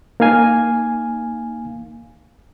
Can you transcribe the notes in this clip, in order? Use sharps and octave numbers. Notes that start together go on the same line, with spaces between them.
A#3 D#4 F5 G#5